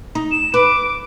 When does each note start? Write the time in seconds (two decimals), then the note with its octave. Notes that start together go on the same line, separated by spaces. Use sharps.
0.15 D#4
0.31 E7
0.54 B4 D6